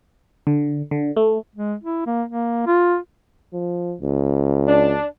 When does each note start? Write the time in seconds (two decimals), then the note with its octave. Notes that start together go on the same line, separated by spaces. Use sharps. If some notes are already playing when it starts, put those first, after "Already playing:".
0.47 D3
0.91 D3
1.17 A3
1.56 G#3
1.84 E4
2.06 A#3
2.29 A#3
2.67 F4
3.53 F3
4.01 C#2
4.68 D4